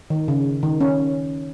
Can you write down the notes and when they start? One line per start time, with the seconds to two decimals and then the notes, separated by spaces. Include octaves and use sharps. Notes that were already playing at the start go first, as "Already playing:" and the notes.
0.10 D#3
0.28 C#3
0.63 D#3
0.81 C#4